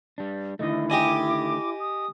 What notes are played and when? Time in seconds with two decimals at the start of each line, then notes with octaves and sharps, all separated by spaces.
0.18 G3 D4
0.59 D3 D#3 A3 E4 D#5
0.90 G4 D#5 G#5 D6
1.80 D#6